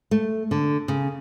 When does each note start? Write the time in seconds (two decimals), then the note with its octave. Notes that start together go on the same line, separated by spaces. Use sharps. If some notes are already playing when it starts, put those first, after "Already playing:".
0.11 A3
0.51 D3
0.88 C#3